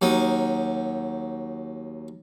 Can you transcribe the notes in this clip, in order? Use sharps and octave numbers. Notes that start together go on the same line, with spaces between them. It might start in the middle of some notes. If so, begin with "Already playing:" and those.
D#2 F#3 D#4